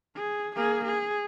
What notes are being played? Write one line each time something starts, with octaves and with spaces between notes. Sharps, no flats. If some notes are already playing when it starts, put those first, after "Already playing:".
G#4
A#3 G#4
G#4